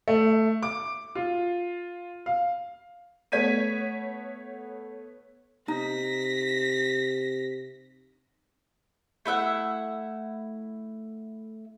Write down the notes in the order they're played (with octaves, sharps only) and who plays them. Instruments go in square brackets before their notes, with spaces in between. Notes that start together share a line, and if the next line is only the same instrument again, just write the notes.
[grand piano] A3
D6
F4
F5
[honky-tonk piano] A3 B3 C#5 G#6 B6 D#7
[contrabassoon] C3 [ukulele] D#4 [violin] A#6 B6
[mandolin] A3 E4 E5 F#5